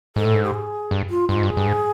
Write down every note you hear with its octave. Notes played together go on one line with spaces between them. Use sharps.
G#2 A4
A2
G#2
G4
G#4
G2
F4
G2 F4
G#2
G2
G#4
G2
G#2